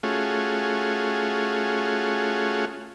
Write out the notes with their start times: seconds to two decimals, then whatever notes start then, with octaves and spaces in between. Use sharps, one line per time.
0.03 A3 C#4 F4 F#4 G#4